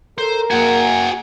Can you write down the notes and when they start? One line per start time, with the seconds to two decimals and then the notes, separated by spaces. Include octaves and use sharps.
0.18 A4 A#4 C5
0.51 A#3 F#4 G#4 F#5 G#5